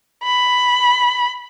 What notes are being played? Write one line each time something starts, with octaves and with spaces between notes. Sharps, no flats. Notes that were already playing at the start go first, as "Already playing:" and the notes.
B5